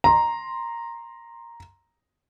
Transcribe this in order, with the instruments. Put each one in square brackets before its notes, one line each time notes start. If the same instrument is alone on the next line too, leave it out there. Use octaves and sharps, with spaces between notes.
[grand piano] A#5 C6